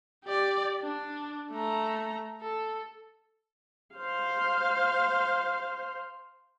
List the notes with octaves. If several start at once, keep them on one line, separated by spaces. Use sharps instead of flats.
G4 D5
D4
A3 A#5
A4
C5 F5